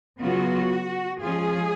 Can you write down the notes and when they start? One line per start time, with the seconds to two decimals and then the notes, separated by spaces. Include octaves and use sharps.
0.21 C#3 F#3 B3 F4 F#4
1.22 F3 G#3 C#4 F4 G#4